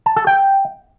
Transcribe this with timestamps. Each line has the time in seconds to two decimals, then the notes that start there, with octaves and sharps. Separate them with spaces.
0.06 A5
0.16 A4
0.27 G5